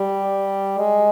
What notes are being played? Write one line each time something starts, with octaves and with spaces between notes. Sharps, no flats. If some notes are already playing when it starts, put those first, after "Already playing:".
Already playing: G3
G#3